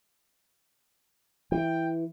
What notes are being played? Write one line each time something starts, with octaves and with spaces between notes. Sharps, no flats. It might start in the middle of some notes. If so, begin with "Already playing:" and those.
E3 G5